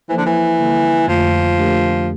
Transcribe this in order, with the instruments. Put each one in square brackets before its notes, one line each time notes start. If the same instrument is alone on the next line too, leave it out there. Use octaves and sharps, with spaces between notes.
[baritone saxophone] E3 [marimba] F3 A#3 E4 A4 C5
[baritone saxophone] D3
E3
[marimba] D3 G3 A#3 E4 A4
[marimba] F2 D3 A3 [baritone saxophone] F3
[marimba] D3 A3 D4 G4 A#4